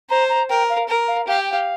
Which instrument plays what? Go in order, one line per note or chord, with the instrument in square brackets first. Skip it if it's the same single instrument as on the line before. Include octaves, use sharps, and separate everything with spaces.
[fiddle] C5 [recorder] A#5
[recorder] A#5
[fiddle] A#4 [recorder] G5
[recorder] F5
[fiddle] A#4
[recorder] F5
[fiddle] G4 [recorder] F5
[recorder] G5
F5